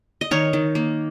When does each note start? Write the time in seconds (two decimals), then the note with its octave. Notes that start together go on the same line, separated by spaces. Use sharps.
0.21 D#5
0.31 D#3 A#4 C#5
0.53 D#3
0.75 A#3